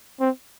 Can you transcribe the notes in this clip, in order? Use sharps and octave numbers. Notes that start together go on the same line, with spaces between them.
C4